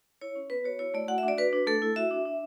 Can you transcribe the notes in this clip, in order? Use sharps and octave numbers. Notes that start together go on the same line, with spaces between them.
E4 C#5
C#4
B3 B4
F#4 C#5
E4 C#5
A3 D5
F#4 F#5
E5
D4
D5
F#4 B4
D4
A3 A4
E4
F#4 E5
D4
D4